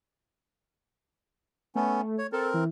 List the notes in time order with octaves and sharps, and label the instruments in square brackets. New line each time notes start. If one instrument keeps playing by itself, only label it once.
[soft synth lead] A3 [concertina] B3 C#4
[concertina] C#5
[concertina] C4 A#4 [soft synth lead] A4
[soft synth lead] E3